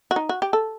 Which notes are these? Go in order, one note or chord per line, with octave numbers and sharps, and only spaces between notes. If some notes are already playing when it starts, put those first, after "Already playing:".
F#4
D#4
F#4
G4
A4